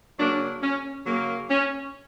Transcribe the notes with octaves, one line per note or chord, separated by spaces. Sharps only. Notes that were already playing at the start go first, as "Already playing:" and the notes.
C#3 F#3 A#3 D4
C#4
C#3 F#3 A#3
C#4